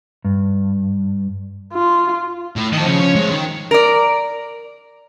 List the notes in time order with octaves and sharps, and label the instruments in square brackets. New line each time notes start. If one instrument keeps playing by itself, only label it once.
[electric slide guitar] G2
[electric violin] F4
[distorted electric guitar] A2
[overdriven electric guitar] D2 D#3 [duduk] F3 [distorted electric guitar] D#5 A5
[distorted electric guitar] C#3 [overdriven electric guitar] C#5
[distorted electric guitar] C#4
G#3 A3
D#3
[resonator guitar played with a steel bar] A#4 D5